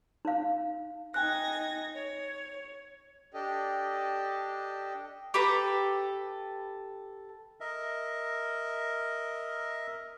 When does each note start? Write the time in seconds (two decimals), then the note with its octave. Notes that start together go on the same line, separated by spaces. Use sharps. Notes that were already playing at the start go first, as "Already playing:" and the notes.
0.25 D#4 F5
1.14 D#4 G5 G#5 F#6 G#6 A#6
1.95 C#5
3.34 D4 G4 A4 D#5
5.34 G4 A4 B4 A#5
7.61 A#4 D#5 E5